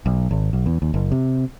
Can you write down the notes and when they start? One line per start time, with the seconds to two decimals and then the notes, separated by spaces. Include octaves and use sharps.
0.06 B1
0.31 G#1
0.53 B1
0.66 E2
0.82 D#2
0.94 F#1
1.12 C3